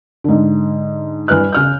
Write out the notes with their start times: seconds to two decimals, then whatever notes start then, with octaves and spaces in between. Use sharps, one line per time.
0.24 G#2 D3
1.28 G2 E3 B4 F6 F#6
1.53 C#3 F6 G6